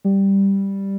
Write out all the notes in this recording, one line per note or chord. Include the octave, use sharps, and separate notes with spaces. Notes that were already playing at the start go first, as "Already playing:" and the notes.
G3